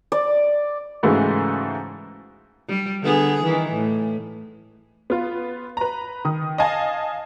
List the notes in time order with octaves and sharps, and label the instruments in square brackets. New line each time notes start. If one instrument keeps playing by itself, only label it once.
[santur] D5
[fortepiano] G#2 C#3 E3 G#3 A3 F#4
[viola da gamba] G3
D3 B3 G#4
D#3 E3
A2
[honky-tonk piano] B3 F4
B4 A#5
D#3 D#6
D#5 F5 G#5 A5